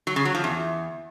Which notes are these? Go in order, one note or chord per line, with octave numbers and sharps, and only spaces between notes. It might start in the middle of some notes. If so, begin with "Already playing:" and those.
F#3
C#3
F#3
F3
E2